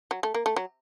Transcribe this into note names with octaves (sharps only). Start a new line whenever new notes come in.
F#3
A3
A#3
A3
F#3